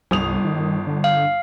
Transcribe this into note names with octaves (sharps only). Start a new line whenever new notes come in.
G1 C2 D#6 F7
D#3
D3
F5